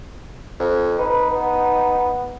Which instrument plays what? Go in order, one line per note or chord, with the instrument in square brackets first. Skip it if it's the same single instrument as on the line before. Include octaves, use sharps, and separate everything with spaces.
[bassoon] F2
[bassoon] D#4 [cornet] B4
[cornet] B3